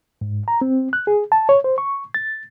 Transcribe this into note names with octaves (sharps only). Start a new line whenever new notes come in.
G#2
A#5
C4
F#6
G#4
A5
C#5
C5
C#6
A6